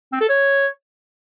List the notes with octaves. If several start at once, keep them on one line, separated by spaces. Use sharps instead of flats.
C4
A4
C#5